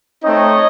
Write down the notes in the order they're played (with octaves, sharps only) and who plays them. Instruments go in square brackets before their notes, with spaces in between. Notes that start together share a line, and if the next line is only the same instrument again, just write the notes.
[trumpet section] A3 C4 D#4 C#5 D#5